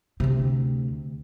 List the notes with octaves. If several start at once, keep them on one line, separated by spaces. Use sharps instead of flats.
D2 C3